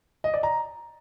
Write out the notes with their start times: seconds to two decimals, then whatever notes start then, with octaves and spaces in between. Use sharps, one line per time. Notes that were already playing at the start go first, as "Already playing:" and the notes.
0.24 D#5
0.34 D5
0.43 A#5